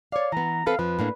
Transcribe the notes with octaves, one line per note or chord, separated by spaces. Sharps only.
C#5 D5 F5
E3 B3 A#5
C4 A4 B4 F5
F2 F3 B4
A2 A#3 D4